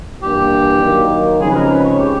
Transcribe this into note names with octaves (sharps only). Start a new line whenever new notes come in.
G2 E3 G3 A#3 D4 G4
D#3 F#3 A#3 D#4
C#3 F3 G#3 C4 D#4 G#4
B4
A#4
B4
C#5
G4